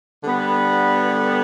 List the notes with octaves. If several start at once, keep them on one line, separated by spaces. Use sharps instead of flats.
D3 G3 B3